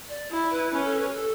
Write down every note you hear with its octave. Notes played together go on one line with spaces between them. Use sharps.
D5
E4
B4
C#4 B4
A4
B4
G4
A4